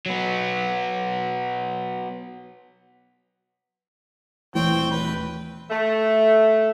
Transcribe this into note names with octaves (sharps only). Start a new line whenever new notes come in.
F#3 B3
D#1 E3 A3 C4 C#5 G5
B4
A3